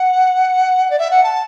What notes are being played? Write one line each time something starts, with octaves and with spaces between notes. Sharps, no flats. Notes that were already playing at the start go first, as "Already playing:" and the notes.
Already playing: F#5
D5
E5
F#5
A5